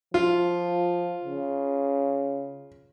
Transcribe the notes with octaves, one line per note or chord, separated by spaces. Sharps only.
F3 F4
C#3